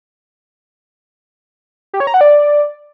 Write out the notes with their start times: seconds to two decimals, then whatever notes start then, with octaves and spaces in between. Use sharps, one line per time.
1.93 G4
2.00 C#5
2.07 A#5
2.14 F#5
2.21 D5